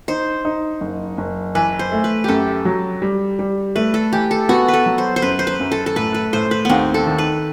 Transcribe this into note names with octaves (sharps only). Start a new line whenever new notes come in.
D#4 C5
D#4
F#1
F#1
E3 B4
C5
A3
B4
F#2 G4 A4
F#3
G3
G3
A3 B4
A4
E3 G4
A4
B3 F#4
B4
A4
F#3
C5
C5
F#2 B4
C5
B4
F#2
A4
A4
A2 B4
B4
A2 C5
B4
D#2 B3 C4
A4
D#3
B4